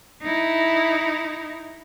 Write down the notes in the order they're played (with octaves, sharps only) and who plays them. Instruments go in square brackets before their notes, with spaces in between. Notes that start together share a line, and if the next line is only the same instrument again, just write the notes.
[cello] D#4 E4